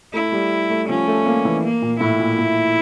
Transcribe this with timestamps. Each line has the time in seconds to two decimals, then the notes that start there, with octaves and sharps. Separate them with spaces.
0.14 A3 E4
0.32 G3
0.70 A3
0.89 F3 C#4
1.08 A3
1.26 A#3
1.45 E3
1.64 A#3
1.82 A#2
2.00 A2 E4
2.19 A#2
2.38 A2